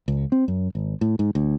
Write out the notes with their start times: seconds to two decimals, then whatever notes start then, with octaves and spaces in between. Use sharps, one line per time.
0.08 C#2
0.32 C4
0.48 F#2
0.75 G#1
1.01 A2
1.19 G#2
1.35 D2